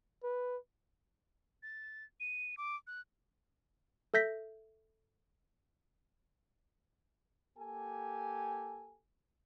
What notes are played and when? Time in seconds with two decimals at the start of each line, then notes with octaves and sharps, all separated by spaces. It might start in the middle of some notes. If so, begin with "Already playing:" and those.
0.23 B4
1.63 A6
2.20 D#7
2.57 D6
2.87 F#6
4.14 A4 E5 G6 A#6 B6
7.58 A#3 G4 A4 G#5